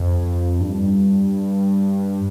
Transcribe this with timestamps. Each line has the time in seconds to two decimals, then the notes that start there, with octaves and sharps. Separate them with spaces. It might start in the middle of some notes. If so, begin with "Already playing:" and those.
Already playing: F2
0.61 G2